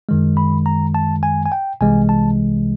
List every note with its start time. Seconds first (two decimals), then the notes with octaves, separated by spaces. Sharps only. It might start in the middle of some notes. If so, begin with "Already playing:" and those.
0.09 F#2 D#3 G#3
0.37 B5
0.66 A#5
0.95 A5
1.23 G#5
1.46 G#5
1.52 G5
1.81 C2 C3 E3 G#3 G#5
2.09 A5